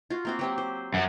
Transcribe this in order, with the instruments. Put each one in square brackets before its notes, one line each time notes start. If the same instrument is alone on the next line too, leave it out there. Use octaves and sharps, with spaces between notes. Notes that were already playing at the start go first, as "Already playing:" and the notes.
[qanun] F4 F#4
A#3 C4 F#4
F#3 C4 G4
C5
[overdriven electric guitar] F#2